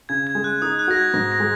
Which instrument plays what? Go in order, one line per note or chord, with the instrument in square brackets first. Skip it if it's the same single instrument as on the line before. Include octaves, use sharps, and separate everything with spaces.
[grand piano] C#3 [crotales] G#6
[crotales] G#6
[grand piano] G#3
[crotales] F#6
[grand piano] D#4 [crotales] D#6
[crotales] F#6
[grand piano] F#4 [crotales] A#6
[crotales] G#6
[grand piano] G#2 [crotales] A#6
[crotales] A#6
[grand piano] G#3